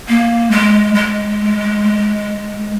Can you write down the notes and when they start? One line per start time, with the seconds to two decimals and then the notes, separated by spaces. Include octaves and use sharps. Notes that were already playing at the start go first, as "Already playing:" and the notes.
0.09 A#3
0.51 G#3
0.95 G#3